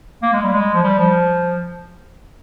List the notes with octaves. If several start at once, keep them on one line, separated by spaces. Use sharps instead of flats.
A#3
G#3
G3
G#3
F3
G3
F3